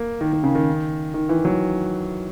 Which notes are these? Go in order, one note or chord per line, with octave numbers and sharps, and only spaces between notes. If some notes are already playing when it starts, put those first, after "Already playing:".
Already playing: A#3
D#3
D#3
C#3
D#3
D#3
E3
F#3